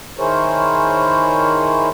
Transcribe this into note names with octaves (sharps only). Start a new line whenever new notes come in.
D#3 E4 G#4 A#4 C5 C#5